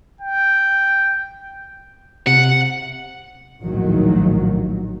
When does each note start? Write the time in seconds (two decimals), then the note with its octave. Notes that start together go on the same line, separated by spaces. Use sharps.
0.21 G5
2.27 C3 F#5
3.62 A#1 D#2 A2 D#3 F#3